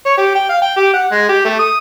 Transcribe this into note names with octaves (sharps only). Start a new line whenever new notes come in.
C#5
G4
G5
F5
G5
G4
F#5
G#3
G4
A3
D#6